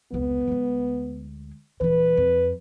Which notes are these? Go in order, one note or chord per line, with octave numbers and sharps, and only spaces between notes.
F1 C#2 B3
D2 G#3
D#1 E3 B4
F2